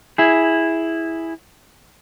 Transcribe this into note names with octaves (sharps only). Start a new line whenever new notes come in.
E4 G#4